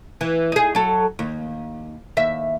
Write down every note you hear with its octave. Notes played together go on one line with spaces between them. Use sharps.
E3
D#4 G#4
F#3 A4
D#2
D#2 E5